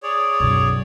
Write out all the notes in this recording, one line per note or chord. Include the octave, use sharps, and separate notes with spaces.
G#4 C#5 D5
B1 F#2